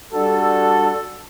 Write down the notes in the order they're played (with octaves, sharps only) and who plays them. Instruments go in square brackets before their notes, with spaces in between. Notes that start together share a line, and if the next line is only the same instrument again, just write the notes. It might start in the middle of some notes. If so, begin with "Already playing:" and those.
[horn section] G3 D4 F#4 A4